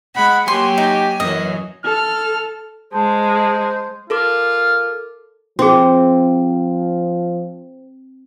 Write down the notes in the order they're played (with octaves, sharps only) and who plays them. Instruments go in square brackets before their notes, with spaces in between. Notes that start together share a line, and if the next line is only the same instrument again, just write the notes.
[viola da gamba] G#3 [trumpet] F#5 [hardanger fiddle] B5
[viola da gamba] F#3 A#3 [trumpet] G4 [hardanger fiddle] G#5 [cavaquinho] C6
[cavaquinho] D#4
[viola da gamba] F#2 E3 F#3 [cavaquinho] D#5
[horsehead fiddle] A4 [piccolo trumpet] F6
[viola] G#3 [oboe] C5 [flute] A5
[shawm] F4 [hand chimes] A4 A#4 D6
[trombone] F3 [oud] C4 [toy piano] F#4 G#4